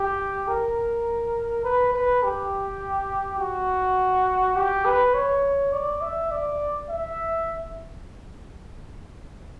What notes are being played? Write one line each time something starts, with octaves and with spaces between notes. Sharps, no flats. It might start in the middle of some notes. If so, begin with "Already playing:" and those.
Already playing: G4
A#4
B4
B4
G4
F#4
G4
B4
C#5
D5
E5
D5
E5